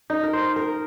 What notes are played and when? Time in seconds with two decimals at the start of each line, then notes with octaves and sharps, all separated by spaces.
0.10 D#4
0.23 A#4
0.33 C5
0.56 A#4